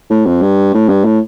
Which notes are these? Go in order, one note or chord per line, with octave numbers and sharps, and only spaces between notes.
A2
F2
G2
A2
G2
A2